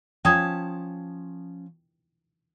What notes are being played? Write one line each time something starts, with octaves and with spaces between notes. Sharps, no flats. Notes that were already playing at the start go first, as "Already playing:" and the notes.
F3 C#4 G5 A5 D#6 G#6